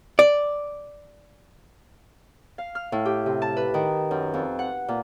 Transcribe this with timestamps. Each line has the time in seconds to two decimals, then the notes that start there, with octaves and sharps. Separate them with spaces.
0.19 D5
2.58 F5
2.75 F6
2.92 A2
3.05 G4
3.26 C3
3.42 A5
3.57 B4
3.74 D#3
4.11 F#2
4.34 F2
4.59 F#5
4.88 A#2